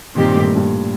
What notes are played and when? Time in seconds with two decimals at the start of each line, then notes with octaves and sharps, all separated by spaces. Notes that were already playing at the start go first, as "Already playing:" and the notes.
0.15 G2 A#2 D#3 G3 C4 G4
0.34 A2
0.56 G2